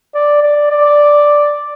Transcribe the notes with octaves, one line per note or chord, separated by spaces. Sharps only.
D5
D5
D5